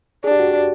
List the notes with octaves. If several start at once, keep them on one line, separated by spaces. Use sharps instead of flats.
D4 G#4
G4
F#4
G4